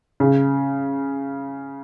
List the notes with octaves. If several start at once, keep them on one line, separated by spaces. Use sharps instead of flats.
C#3